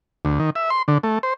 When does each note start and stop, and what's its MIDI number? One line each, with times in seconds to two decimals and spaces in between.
0.25 0.39 38
0.39 0.50 51
0.55 0.70 76
0.70 0.82 84
0.88 0.98 50
1.03 1.19 57
1.23 1.34 72